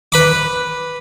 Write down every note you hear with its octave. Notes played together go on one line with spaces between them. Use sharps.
B4 B5 D6